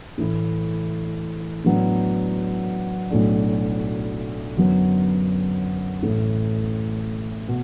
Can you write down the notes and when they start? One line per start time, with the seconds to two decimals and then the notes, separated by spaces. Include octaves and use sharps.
0.18 A2 E3 A3 E4
1.64 A2 F#3 B3 D4
3.10 B1 A2 F#3 A3 D4
4.57 F#2 D3 F#3 B3
6.02 A1 A2 A3
7.48 B2